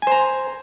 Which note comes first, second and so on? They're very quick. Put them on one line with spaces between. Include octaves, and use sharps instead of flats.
G#5 C5 A#5